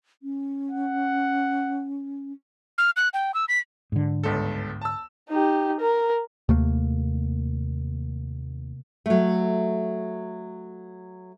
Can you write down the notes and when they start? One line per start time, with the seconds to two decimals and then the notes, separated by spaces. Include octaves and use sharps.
0.23 C#4
0.71 F#5
2.78 F6
2.97 F#6
3.14 G5
3.34 E6
3.49 B6
3.92 G#2 D3
4.24 G1 C#2 A4
4.81 A5 E6
5.29 D#4 G4
5.80 A#4
6.49 D#2 C3 A3 A#3
9.06 F#3 A3